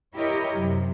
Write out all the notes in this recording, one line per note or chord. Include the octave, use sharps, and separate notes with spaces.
E4 G4 A#4 C#5 D#5
F#2 C3